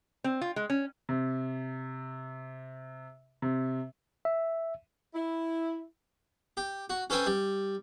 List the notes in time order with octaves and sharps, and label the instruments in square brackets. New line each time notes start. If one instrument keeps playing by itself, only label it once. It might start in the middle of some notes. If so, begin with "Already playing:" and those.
[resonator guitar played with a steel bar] C4
F4
G#3
C#4
[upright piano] C3
C3
[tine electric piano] E5
[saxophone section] E4
[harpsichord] G4
F#4
C#4 A4 B4 C5 G5 G#5
G3